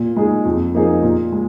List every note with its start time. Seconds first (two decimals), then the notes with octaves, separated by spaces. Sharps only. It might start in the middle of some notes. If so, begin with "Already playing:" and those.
Already playing: A#2
0.16 G#3 D#4 G#4
0.45 F2
0.74 F3 A#3 D#4 G#4
1.03 A#2
1.32 G#3